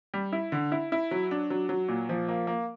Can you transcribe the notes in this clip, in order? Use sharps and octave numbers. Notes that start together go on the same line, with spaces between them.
G3
E4
D3
E4
E4
F#3
D4
F#3
F#3
A#2
F3
A#3
A#3